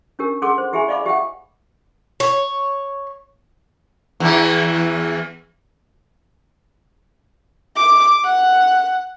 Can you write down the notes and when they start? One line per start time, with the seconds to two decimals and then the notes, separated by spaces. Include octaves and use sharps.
0.19 C#4 D4 G4 A#4
0.42 G#4 A4 F#5 C6 D6 E6
0.58 C5
0.73 E4 G4 G#4 E5 G#5 B5
0.88 D5 D#5 F5 B5 D6
1.06 G4 E5 F#5 G5
2.20 C#5
4.20 E2 E3
7.76 D6
8.24 F#5